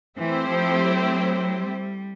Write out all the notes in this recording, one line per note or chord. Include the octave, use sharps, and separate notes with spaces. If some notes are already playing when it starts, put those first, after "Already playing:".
E3 A3 C4 E4 G4 C5
F3
F#3
F#3
G3